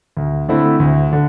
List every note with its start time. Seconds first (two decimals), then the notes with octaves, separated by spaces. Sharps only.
0.17 D2
0.49 D3 A3 C4 E4
0.80 D2
1.13 D3